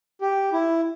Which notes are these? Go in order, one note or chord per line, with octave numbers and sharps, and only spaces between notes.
G4
E4